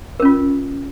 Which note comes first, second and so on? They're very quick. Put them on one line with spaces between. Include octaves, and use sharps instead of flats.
A#4 C#4 F4